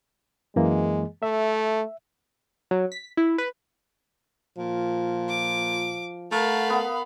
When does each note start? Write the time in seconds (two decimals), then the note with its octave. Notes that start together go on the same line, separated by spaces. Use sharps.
0.56 F#2 E3 G#3 A#3
1.23 A3 E5
2.71 F#3
2.92 B6
3.17 E4
3.38 B4
4.58 A#2 F3
5.29 D6
6.32 A3 A#4 F5 F#5 B5
6.70 B3 F#5